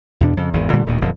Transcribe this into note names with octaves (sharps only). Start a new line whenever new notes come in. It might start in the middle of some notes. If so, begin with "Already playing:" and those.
E2 B2 D4
F2 C#3
G#1 E2 G#2 D#3
A#2 D3 G3 A3
D#1 D2 A#2 D#3
D#1 F2 A#2 D3